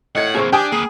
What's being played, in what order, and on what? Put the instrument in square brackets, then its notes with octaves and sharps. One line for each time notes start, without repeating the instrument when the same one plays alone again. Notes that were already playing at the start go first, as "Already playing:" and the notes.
[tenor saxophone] A2 [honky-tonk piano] D#5 G#6 [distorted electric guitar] F#5
[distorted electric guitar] A#3 C4 [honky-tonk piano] G#4 C5 C#6
[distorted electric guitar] D4 [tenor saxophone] G4 [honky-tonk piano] G5 G#5 D#6
[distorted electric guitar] A#3 B4 [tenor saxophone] G#4